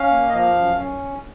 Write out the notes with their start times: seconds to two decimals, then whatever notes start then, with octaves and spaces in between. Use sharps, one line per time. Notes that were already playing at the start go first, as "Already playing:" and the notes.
Already playing: C#4 F5
0.10 A#3
0.29 D#5
0.33 F3 F5
0.56 F#2
0.78 C#4